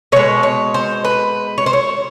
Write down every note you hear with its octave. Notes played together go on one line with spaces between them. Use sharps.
B2 G#3 C#5
C#5
C5
B4
C#5
C5
C#5